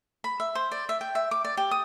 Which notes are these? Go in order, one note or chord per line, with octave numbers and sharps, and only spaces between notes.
B5
E5
C5
D5
E5
G5
E5
D6
D5
G4
D#6